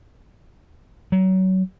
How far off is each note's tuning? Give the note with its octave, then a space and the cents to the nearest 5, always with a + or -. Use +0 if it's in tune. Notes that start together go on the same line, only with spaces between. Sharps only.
F#3 +25